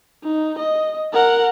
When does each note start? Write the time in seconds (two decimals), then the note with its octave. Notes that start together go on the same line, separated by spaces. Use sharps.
0.23 D#4
0.58 D#5
1.13 A#4 F#5